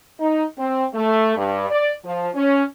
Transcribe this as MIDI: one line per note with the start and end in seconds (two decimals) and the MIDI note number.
0.20 0.44 63
0.58 0.85 60
0.94 1.36 57
1.37 1.69 43
1.70 1.92 74
2.05 2.29 53
2.35 2.63 61